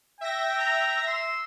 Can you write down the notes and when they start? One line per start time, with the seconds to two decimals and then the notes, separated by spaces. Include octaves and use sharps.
0.21 E5 G5 A#6
0.59 A#5
1.07 C6 E6